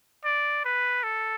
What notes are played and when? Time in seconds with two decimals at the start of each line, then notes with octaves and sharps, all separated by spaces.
0.24 D5
0.64 B4
1.03 A4